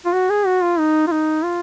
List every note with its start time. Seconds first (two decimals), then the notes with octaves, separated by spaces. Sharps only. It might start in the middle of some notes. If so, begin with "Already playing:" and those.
0.06 F4
0.13 F#4
0.30 G#4
0.46 F#4
0.63 F4
0.79 D#4
1.08 F4
1.12 D#4
1.44 F4